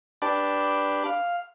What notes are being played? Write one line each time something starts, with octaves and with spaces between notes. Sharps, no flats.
D4 G4 B4 D5 A5
F5